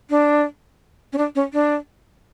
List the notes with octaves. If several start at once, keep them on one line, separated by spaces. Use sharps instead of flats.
D4
C#4
D4
C#4
D4